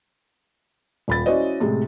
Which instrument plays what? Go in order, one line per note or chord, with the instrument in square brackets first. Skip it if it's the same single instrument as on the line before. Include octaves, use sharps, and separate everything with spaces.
[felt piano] D#1 B5 A6
C#4 E4 F#4 C5 D5 D#5
A2 C3 G#3